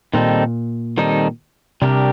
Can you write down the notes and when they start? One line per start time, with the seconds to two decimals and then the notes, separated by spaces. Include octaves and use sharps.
0.14 A#2 D#3 G3 C4 D#4 A4
0.98 D#3 G3 C4 D#4 A4
1.82 C3 G3 D4 G4 A#4